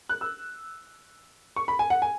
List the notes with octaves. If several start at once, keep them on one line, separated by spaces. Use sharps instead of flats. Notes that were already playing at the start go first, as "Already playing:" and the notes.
F#6
E6
C#6
B5
G#5
F#5
G#5